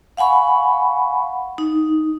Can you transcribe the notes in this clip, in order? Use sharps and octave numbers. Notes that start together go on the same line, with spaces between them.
F5 F#5 G#5 B5 C#6
D#4